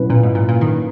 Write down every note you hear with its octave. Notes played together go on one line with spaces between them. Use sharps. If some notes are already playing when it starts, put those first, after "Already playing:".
Already playing: B2 F#3 C#4 E4 B4
A#2
G#2
A#2
A#2
D#3